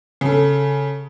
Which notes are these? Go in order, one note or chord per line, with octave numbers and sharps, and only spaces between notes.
C#3 A4